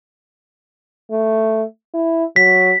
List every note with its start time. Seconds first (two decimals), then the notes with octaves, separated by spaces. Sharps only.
1.11 A3
1.94 E4
2.36 F#3 B6